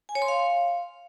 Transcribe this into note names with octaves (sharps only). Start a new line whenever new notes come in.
G#5
C#5
C6
F5